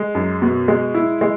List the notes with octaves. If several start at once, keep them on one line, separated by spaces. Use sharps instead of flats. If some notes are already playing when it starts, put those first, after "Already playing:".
Already playing: G#3
F#2
B2
G#3
E4
G#3